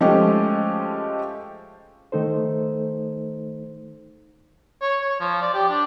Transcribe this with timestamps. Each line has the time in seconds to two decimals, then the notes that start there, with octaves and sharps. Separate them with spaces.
0.01 F3 G#3 A3 C#4 G4
2.12 D#3 A3 D#4 A4 C5
4.82 C#5
5.02 C#5
5.21 F3
5.42 D5
5.54 G4
5.69 D4